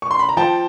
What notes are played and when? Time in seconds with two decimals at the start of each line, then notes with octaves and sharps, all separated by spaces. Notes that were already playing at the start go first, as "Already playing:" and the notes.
0.02 C#6
0.11 C6
0.19 B5
0.29 A#5
0.37 F3 G5 A5